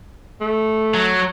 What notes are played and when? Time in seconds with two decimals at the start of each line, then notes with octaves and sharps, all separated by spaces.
0.41 A3
0.95 F#3